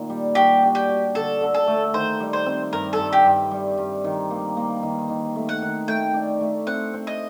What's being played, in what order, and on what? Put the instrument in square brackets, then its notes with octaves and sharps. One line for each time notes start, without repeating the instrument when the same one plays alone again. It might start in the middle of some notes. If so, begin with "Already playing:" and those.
Already playing: [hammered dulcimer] A#2 D#3
G3
[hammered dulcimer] F#4 [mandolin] G4
[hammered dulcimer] D4
[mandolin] G4
[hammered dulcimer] F#4
[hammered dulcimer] D3 [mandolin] A4
[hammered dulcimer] D3
[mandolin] A4
[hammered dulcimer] A3
[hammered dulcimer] D#3 [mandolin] C5
[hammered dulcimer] G3
[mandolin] C5
[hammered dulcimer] C4
[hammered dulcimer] G2 [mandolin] A#4
[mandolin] A4
[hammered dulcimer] G2
[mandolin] G4
[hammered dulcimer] G2
G3
G2
D#3
A#3
A#3
D#3
D#3
A3
[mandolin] F#5
[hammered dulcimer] D#3
[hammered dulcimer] A3 [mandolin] G5
[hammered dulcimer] D4
A3
[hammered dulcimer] C4 [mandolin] F#5
[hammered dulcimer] C4
[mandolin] D#5